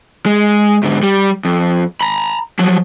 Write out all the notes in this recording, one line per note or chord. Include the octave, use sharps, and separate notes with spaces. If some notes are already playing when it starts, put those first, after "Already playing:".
G#3
G#2 D3
G3
F2
A#5 B5
F3 F#3